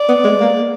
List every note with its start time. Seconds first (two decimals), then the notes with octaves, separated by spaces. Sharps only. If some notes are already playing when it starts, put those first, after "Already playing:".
Already playing: D5
0.09 B3
0.24 G#3
0.40 A#3